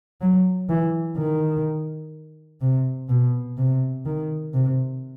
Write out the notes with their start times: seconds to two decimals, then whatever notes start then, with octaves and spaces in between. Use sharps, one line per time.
0.21 F#3
0.69 E3
1.17 D#3
2.61 C3
3.09 B2
3.57 C3
4.06 D#3
4.54 C3